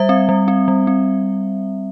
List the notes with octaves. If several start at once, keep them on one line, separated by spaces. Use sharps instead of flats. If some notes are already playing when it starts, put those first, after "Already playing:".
Already playing: G3 E5
C4
G3
C4
G3
C4